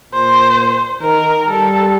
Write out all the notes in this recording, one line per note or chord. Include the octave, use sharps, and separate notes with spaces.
A#2 C5
D#3 A#4
G3 A4